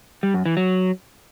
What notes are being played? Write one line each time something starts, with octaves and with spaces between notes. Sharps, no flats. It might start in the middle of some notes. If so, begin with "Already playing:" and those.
G3
F#2
E3
F#3